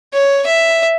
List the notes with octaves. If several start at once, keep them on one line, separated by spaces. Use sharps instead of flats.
C#5
E5